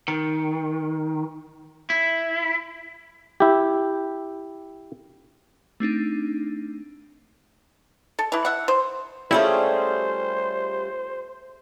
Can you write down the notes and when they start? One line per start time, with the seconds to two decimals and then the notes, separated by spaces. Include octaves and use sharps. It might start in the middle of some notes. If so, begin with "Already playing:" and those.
0.08 D#3
1.90 E4
3.40 E4 G4
5.80 A3 C4 D4 D#4
8.19 A4
8.32 E3 E4
8.45 E5 F#5
8.68 C5
9.31 G3 A3 C#4 E4 F4 G#4 C5